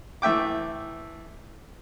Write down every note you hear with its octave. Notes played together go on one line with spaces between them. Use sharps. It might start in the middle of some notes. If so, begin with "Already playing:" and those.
E3 A3 E5 G5 D6